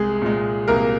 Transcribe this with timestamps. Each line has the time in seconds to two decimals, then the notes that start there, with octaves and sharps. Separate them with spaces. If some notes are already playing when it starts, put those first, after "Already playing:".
Already playing: C2 G#3 G#4
0.22 A#2 G#3
0.68 C2 A#3 A#4